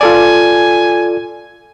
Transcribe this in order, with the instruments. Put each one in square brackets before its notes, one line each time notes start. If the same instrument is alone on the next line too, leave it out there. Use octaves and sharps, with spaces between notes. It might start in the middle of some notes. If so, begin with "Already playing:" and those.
[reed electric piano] F4 A4 D5 [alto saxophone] G#5